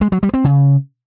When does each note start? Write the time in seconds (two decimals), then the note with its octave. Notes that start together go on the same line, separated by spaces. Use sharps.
0.01 G#3
0.12 F#3
0.23 G3
0.34 C4
0.44 C#3